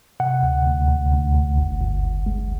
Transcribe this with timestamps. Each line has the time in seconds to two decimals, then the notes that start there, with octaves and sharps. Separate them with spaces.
0.20 C3 F#5
0.43 D2
0.66 D2
0.89 D2
1.12 D2
1.35 D2
1.58 G1
1.81 G1
2.04 G1
2.26 G#3